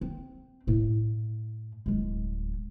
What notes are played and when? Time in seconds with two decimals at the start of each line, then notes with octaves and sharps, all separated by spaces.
0.01 C4
0.67 A2 A3
1.86 D1 G#3